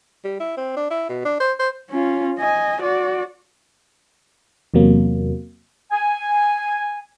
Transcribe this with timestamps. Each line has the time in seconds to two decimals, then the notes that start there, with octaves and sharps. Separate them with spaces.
0.24 G3
0.40 E4
0.57 C4
0.77 D4
0.91 E4
1.09 B2
1.25 D4
1.40 C5
1.59 C5
1.91 C#4 F4
2.39 D#5 G#5
2.82 F#4 D5
4.74 E2 C3 F#3 A#3
5.91 G#5